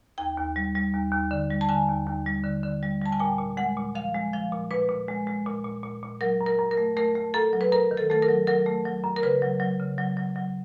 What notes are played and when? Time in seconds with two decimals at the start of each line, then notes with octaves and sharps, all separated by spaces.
0.18 D#2 G5
0.38 D#2
0.56 G3
0.75 G3
0.94 D#2
1.12 D#2
1.31 D3
1.50 G3
1.61 A5
1.69 D3 G#5
1.88 D#2
2.07 D#2
2.26 G3
2.44 D3
2.63 D3
2.83 G3
3.01 G3 A5
3.12 G#5
3.20 A#2 G5
3.39 A#2
3.57 G#3 F#5
3.77 A#2
3.95 F3 F5
4.14 G#3
4.33 F3 F5
4.52 A#2
4.71 A#2 B4
4.89 A#2
5.08 G#3
5.27 G#3
5.47 A#2
5.65 A#2
5.83 A#2
6.03 A#2
6.21 F#3 A#4
6.41 F#2
6.46 A#4
6.59 F#2
6.71 A#4
6.78 A3
6.97 A3 A#4
7.15 A3
7.34 F#2 A4
7.53 F#3
7.61 B4
7.72 F#2 A#4
7.91 D#3
7.98 A4
8.10 A3 A4
8.22 A#4
8.29 F#3
8.47 F#3 A#4
8.66 A3
8.85 F#3
9.04 F#2
9.16 A#4
9.23 C#3 B4
9.42 F#3
9.60 F#3
9.80 C#3
9.98 F#3
10.17 F#3
10.36 F#3